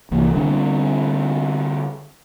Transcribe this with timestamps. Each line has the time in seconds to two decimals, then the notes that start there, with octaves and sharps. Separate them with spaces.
0.11 C2 E3 A#3
0.34 D3 G3 C4 D4